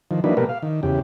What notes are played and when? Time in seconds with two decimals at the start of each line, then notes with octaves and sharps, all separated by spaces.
0.11 D#3 F3
0.24 E3 F#3 A#3 D4 D#4 B4
0.37 B2 A3 A#3 G4 A#4 B4
0.49 F5
0.63 D#3
0.83 E2 C#3 G4